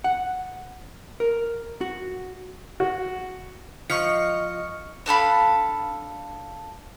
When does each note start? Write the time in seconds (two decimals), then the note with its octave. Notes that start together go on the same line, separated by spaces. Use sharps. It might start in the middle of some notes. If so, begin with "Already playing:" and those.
0.04 F#5
1.20 A#4
1.81 F#4
2.80 F#4
3.90 F3 D#5 C#6 F6 C#7
5.06 D4 A4 F5 B5